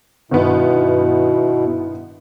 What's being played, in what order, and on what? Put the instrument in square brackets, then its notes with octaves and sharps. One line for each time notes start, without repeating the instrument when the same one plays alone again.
[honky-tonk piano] G1 D#3 B3 [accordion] B2 [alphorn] E4